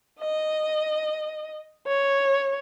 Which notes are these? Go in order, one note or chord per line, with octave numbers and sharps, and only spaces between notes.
D#5
C#5